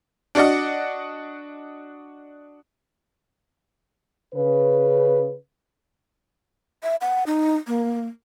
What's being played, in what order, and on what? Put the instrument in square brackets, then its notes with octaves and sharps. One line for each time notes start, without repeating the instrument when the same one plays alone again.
[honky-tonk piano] D4 F#4 D5 D#5 F#5
[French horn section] C#3 B4
[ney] E5
F#5
D#4
A#3